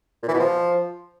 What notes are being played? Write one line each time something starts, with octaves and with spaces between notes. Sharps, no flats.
A#2
E3
B2
F3